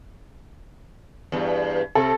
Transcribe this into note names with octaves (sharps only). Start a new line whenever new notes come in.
E2 G2
C3 A4